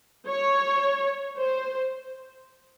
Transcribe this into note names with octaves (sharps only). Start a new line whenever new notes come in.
C#5
C5